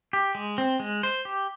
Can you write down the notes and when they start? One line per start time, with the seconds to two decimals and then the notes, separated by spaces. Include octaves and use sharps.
0.13 G4
0.35 G#3
0.58 C4
0.80 G#3
1.03 C5
1.25 G4